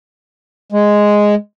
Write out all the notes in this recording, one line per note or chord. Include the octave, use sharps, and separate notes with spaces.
G#3